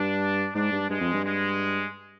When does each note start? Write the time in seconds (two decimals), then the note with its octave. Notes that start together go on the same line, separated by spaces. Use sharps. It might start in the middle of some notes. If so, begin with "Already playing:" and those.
Already playing: G2 D4
0.55 G#2 D4
0.72 G2
0.89 G2 G#3
1.01 F2
1.13 G2
1.25 G#3